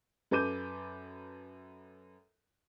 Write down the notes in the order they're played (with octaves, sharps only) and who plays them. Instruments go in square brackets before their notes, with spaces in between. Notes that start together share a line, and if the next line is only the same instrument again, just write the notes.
[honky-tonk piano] F#2 A4 B4 D6 G6 D#7